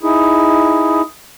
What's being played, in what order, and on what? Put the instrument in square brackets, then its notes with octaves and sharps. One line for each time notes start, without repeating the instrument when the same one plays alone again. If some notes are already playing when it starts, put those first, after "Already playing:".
[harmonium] D#4 E4 G#4